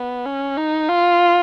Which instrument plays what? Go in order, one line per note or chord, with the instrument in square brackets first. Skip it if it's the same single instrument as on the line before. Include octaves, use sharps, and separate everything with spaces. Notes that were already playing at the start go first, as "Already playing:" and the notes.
Already playing: [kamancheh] B3
C#4
D#4
F4